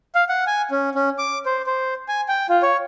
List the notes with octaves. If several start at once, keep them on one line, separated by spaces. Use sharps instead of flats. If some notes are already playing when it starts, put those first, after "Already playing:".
F5
F#5
G#5
C#4
C#4
D6
C5
C5
G#5
G5
F4
C#5